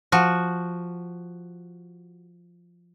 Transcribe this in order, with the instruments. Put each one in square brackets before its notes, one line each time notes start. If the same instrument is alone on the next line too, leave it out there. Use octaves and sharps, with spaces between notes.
[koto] F3 F#4